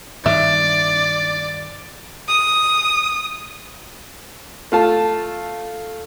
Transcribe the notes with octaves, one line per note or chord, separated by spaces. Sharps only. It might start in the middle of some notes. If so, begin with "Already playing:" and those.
G2 D#3 D5 E5
D#6
A3 F4 A5